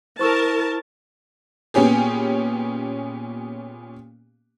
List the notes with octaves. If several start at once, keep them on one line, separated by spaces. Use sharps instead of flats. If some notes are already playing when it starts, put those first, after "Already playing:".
E4 A#4 C5 A5 C#6 E6
A#2 B3 C#4 G4 G#4